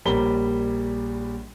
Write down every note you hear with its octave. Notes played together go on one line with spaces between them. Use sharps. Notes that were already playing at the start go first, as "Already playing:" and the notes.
A#1 G3 A#4 C#5 B5 G7